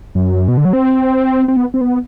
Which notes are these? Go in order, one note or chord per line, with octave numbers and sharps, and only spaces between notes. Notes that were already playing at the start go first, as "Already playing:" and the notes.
F#2
B2
D3
F#3
C4
C4
B3
C4
B3